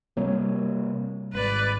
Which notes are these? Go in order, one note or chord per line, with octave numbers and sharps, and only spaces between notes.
C3 G3 A#3 C#5
G#1 B4 D5